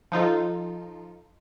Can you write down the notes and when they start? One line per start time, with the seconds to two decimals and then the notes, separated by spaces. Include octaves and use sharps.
0.12 F3 D#4 F4 A4